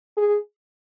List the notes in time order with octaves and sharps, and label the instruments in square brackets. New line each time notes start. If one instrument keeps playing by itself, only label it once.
[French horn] G#4